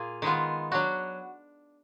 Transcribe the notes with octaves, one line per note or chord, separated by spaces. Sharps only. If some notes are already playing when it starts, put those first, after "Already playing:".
Already playing: A#2 A#3 F4 G#4
D#3 G#3 B3 F4
F#3 D4 F#4